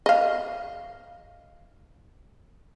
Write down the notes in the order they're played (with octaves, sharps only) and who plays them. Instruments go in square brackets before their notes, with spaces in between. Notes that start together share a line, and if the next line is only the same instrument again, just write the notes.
[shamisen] D#5 F5